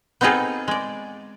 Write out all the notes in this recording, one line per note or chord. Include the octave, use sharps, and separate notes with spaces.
B3 C4 D#4 F4 G#4 A4
G#3 D5